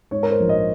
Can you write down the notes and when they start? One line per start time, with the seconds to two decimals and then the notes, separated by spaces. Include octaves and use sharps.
0.11 G#2 C#5
0.23 A#4
0.30 C5
0.40 A#1
0.49 D#5